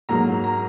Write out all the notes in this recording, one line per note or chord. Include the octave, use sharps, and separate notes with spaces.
G#2 F#3 A#3 A#5
A#5